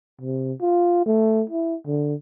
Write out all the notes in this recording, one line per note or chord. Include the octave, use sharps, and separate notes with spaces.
C3
F4
A3
E4
D3